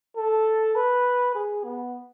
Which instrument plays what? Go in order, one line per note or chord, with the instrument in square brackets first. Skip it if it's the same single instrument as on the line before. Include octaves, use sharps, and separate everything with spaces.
[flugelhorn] A4
B4
G#4
B3